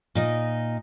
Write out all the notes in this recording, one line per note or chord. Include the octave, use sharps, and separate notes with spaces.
A#2 D#4 D#5